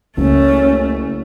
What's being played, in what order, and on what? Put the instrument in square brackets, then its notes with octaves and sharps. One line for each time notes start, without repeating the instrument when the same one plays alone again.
[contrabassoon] F#1 [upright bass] C#2 [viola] A3 [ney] C#4